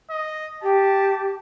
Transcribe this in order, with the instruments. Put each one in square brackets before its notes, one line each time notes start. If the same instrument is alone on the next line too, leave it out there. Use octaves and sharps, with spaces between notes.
[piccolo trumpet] D#5
[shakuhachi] G4 [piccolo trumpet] A5